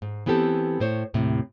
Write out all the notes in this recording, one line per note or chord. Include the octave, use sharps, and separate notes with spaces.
G#2
E3 B3 C4 G4 A4
A2 C5 C#5
D#2 A2 C3